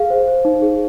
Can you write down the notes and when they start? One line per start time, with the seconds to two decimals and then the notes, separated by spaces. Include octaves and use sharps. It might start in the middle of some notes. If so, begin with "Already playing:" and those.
Already playing: G#4 F5
0.10 C5
0.28 C5
0.45 D#4
0.62 G#4